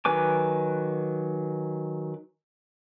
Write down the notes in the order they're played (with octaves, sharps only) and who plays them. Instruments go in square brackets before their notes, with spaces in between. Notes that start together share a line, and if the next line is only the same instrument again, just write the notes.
[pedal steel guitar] D#3 F#3 B4 G#5 D6